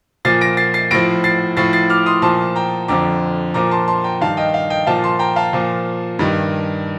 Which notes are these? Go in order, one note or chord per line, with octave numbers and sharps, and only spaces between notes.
A#2 F3 A6 C7
A#6 D7
A6 C7
A6 C7
A2 F3 A#6 D7
A6 C7
A2 F3 A6 C7
A6 C7
D6 F6
C6 D#6
A#2 F3 A5 C6
G5 A#5
F2 D3 F3 A#5 D6
A#2 F3 A#5 D6
A5 C6
A5 C6
G5 A#5
G2 D#3 F5 A5
D#5 G5
F5
D#5 G5
A#2 F3 F5 A5
A5 C6
G5 A#5
F5 A5
A#2 F3
G2 D#3